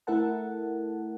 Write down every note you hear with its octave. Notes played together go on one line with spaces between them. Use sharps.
A3 E4 A4 A#4 F#5 A5